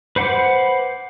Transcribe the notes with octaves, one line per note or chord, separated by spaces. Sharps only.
B4 C5 F#5 B5 D6